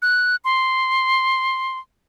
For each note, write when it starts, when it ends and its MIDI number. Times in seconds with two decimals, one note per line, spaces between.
0.02 0.36 90
0.45 1.78 84